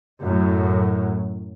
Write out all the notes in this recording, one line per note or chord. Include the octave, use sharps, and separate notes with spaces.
F#2 A2 F#3